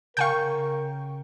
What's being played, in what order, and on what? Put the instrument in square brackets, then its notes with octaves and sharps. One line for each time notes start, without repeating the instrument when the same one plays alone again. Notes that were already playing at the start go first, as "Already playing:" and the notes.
[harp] C#3 [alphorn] A#4 [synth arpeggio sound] F5 G#5 G6 [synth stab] G5 C#6